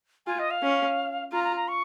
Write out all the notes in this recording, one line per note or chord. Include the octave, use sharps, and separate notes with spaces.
F4 G#5
D#5
F5
C#4
F4 A#5
A#5
A#5
C#6